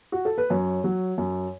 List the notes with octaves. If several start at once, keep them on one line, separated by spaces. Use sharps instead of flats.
F#4
A4
B4
F#2 C#5
F#3
F#2